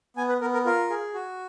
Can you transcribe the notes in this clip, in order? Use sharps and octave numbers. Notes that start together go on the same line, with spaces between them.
B3 G#5
B4
B3 A#4
A#4
F4 A#4
G#4
F#4